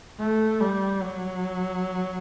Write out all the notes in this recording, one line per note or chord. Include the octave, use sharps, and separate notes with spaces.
A3
G3
F#3